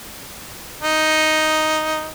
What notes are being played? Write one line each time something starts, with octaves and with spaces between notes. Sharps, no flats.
D#4